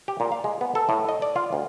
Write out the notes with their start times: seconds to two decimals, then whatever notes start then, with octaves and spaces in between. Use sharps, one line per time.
0.08 G4
0.20 A#2
0.32 F5
0.44 G#3
0.61 B3
0.75 A4
0.89 A2
1.09 D#5
1.22 D5
1.36 F4
1.53 D2